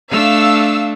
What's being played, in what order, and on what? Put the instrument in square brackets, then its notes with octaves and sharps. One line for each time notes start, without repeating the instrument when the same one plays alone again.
[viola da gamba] A3 D4 [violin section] F5 E6